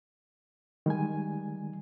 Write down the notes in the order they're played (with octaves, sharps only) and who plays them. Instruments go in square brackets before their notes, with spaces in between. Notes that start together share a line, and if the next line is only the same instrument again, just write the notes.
[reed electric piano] D#3 G3 G#3 G#5